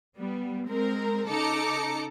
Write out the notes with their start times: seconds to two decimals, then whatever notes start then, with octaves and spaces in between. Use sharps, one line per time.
0.18 G3 B3
0.68 G#3 C4 A#4
1.29 C#3 D#4 A4 A#5 D6 C#7